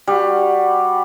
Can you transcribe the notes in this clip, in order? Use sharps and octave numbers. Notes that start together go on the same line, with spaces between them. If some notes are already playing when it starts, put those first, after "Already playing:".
G3 F#4